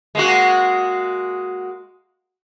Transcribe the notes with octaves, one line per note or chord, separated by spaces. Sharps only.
G#3 A#3 F#4